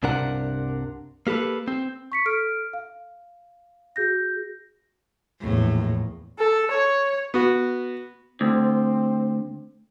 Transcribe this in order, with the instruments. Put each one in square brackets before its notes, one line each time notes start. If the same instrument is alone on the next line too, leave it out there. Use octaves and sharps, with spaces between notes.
[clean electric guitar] C2 G2 C3 D4 A#4 F#5
A#3 G4 A4 B4
C4
[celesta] C#6 B6 C#7
A4 F6 D7
F5
F#4 G#4 G6 A#6
[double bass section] A#1 E2 [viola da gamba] A2
[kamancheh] A4
C#5
[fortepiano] B3 F#4
[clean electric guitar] D2 [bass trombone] C4